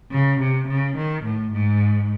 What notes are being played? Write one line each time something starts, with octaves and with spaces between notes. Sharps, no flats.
C#3
C3
C#3
D#3
A2
G#2